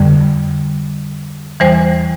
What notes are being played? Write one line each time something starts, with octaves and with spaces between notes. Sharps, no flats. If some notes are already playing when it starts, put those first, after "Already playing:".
Already playing: F2 D3 G3
E2 E3 G3 C5